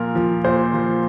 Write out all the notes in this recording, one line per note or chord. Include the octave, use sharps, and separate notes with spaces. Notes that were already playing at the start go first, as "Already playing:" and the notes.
Already playing: A#2 F3 A#4
F3
A#2 C5
F3